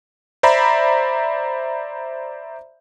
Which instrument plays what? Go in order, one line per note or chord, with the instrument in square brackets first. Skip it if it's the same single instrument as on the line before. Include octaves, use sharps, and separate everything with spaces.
[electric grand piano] C5 D5 E5 A#5 B5